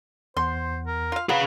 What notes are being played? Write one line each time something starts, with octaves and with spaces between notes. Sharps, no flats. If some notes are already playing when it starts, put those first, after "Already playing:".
E2 C5 F#5 C6
A#4
F4 F5
F#3 G#4 B4 F5